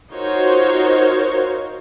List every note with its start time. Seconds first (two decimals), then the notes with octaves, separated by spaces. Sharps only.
0.12 D#4 F4 F#4 A#4 C5 C#5